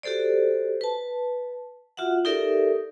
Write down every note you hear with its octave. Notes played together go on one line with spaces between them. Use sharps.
F#4 G4 A4 C5 D5
B4 A5
F4 F#4 E5 F#5
D#4 G4 A4 A#4 D5 E5